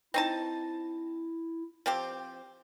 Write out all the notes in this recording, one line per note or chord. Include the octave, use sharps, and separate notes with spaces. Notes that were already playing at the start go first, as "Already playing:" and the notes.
C4 D#4 E4 A5
F3 C4 G4